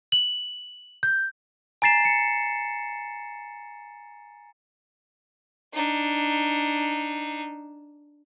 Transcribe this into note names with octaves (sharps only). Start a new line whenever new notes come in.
F#7
G6
G#5 A#5 A6 C7 E7
C#7
D4 D#4